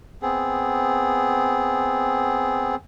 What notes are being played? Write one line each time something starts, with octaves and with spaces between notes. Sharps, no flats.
B3 C4 G#4